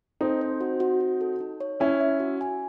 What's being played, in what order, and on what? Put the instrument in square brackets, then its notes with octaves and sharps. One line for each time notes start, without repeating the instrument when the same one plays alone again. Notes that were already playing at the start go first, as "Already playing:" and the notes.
[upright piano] C4 D#4 [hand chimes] A4
[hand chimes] C5
F#4
F#4
F#4
A4
D#4
C#5
[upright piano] C#4 E4 [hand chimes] C#5
[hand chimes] E5
F#4
G#5